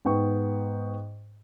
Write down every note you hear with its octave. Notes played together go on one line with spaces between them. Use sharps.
G#2 B3 G5 C#6